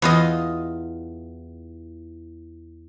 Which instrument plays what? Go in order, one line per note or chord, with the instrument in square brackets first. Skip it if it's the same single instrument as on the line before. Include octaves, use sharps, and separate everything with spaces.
[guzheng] E2 F4 D#5